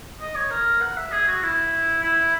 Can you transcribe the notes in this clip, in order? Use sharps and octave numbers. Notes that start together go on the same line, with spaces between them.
D#5
C#5
A#4
F#5
E5
G#4
F#4
E4
E4